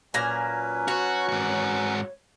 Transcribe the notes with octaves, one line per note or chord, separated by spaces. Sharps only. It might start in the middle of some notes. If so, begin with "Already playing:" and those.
A#2 F#3 C#4 B4 G#5 A#5
F#4 C#5
G#2 F#4